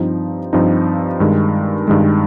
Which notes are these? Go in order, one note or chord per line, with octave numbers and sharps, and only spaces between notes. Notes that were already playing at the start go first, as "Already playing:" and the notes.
Already playing: G2 F3 C4 D#4
G2 F3 C4 D#4
G2 D#3 G#3
G2 D#3 G#3